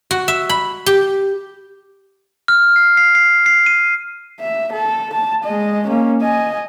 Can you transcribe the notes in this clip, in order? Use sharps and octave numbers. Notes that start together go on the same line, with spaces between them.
F#4
E5
B5
G4
F6
C7
C7
C7
C7
D#7
E5
A4
A5
G#3 D#5
A#3 C#4
D#5 G#5